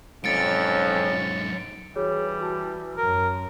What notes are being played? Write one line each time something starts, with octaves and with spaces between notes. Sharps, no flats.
F2 G#2 F#3 C#4 A6 C#7 D7
E3 G3 F#4 G#4 C#5
F#4 A5
F#2 A#4